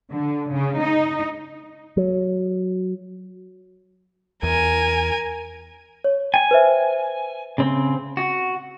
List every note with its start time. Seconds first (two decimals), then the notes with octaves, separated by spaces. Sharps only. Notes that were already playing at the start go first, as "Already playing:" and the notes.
0.12 D3
0.52 C#3
0.81 D#4
1.97 F#3
4.43 E2 A#4 G#5
6.04 C#5
6.34 G5 G#5
6.51 B4 C5 E5
7.58 C#3 C4
8.17 F#4